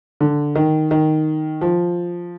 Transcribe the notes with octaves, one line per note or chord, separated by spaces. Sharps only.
D3
D#3
D#3
F3